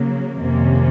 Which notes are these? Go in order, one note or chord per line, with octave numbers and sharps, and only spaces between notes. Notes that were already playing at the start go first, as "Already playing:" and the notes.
Already playing: C#3 F#3 A#3
F2 C3 D#3 A#3 C#4